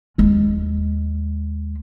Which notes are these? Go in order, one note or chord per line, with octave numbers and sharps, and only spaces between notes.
D#2 G#3